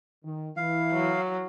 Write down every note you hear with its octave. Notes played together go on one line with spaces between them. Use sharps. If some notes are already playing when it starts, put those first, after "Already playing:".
D#3
E3 E4 F5
F#3